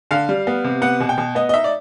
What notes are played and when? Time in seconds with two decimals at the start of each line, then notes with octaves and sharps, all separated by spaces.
0.11 D3 F5
0.29 G3
0.47 B3
0.64 C3
0.82 B3 F#5
1.00 B2
1.09 G5
1.18 B2
1.35 B3 D#5
1.49 D#5
1.54 D#4 E5
1.64 D5